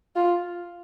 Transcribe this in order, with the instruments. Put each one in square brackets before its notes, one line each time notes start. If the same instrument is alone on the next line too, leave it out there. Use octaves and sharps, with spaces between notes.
[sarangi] F4